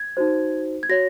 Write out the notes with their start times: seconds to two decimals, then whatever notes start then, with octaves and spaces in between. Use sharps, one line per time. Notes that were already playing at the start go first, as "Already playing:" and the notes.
Already playing: G#6
0.17 D#4 F#4 C5
0.83 G#6
0.89 F#4 C#5 A#6